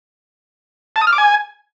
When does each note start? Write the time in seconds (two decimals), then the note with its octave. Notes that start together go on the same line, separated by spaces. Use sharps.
0.96 A5
1.01 D#6
1.07 F6
1.13 D6
1.18 G#5